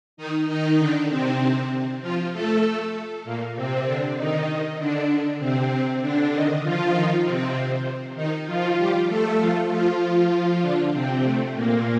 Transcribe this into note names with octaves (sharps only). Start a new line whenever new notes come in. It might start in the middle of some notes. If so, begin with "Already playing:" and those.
D#3 D#4
D#3 D#4
D3 D4
C3 C4
C3 C4
F3 F4
A3 A4
A#2 A#3
C3 C4
D3 D4
D#3 D#4
D#3 D#4
D3 D4
C3 C4
C3 C4
D3 D4
D#3 D#4
F3 F4
D#3 D#4
C3 C4
D#3 D#4
F3 F4
G3 G4
A3 A4
F3 F4
F3 F4
F3 F4
D3 D4
C3 C4
A3
A#2 A#3